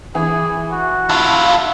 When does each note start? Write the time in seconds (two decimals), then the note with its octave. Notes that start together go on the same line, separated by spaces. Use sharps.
0.15 E3 G#4
0.72 F#4
1.10 E4 F4 A5